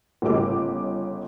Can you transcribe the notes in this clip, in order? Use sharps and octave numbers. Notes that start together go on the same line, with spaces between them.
G1 C#3 G4 D#5 D6